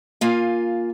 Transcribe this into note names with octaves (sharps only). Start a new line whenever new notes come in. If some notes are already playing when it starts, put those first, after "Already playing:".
A#3 F4 F5 G#5